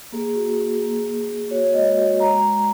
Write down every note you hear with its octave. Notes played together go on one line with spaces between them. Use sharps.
A#3 G#4
F#4
A#3
A#3
A#3
A#3
F#4 C#5
G#3 D#5
F#4
G#3 A#5
G#3